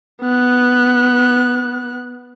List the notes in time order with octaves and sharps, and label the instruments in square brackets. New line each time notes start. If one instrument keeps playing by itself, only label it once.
[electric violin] B3 F#6